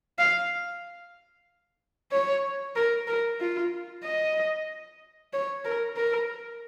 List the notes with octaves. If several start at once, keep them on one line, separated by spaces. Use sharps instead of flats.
F5
C#5
A#4
A#4
F4
D#5
C#5
A#4
A#4